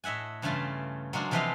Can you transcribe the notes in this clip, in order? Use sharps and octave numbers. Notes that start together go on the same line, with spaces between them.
A2 D#5 E5 F#5 G#5
G2 C#3 E3 A3 F4 A5
F#3 G#3 A#3 D4 F4
C3 E3 F3 B3 D#5 F5